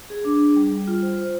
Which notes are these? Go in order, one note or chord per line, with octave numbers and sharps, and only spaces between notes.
G#4
D4
G#4
G3
G3
F4
C5
C5